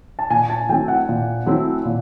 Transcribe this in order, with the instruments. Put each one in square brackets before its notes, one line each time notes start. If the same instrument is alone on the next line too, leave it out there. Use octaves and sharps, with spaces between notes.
[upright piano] A5
[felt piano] A#2 [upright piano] G#5
[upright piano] A5
[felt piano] F#3 A3 C4 E4 [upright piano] G5
[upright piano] F#5
[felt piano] A#2
F#3 A3 C4 E4
A#2